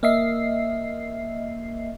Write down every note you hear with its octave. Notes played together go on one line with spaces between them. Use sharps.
A#3 D#5 E5 C7